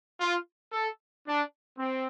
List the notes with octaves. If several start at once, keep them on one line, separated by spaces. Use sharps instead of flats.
F4
A4
D4
C4